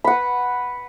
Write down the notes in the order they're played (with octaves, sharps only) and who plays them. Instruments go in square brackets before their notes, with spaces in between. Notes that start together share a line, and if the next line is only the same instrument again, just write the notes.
[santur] B5
F#5
B4